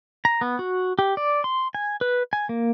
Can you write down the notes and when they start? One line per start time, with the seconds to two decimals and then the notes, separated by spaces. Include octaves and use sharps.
0.25 A#5
0.41 B3
0.59 F#4
0.99 G4
1.17 D5
1.44 C6
1.75 G#5
2.01 B4
2.33 G#5
2.49 A#3